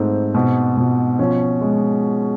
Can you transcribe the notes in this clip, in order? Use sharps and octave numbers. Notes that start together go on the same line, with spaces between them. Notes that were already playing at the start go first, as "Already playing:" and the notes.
Already playing: G#2 A3 C4
B2
B2
F3 C#4
G#3